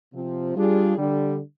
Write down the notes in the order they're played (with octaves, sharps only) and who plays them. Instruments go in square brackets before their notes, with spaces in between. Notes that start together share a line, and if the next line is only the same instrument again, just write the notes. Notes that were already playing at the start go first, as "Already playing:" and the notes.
[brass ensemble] C3 F3 C4
G3 D4 F4 G#4
D3 G3 D4